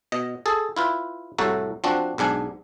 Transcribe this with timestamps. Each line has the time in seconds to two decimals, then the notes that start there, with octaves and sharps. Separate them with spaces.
0.12 B2 D#5
0.46 G#4 A4
0.77 E4 F4 B4
1.38 C2 A2 A3 F#4 A4 A#5
1.84 F3 C4 D4 F#4
2.18 B1 G#2 D4 G#5